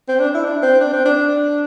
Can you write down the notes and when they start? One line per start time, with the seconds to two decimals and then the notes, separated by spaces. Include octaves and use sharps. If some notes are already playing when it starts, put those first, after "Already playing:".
0.08 C4
0.20 D4
0.35 E4
0.44 D4
0.63 C4
0.80 D4
0.93 C4
1.05 D4